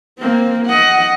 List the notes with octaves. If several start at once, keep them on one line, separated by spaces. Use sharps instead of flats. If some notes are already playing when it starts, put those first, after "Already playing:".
A#3 C4
D#5 F#5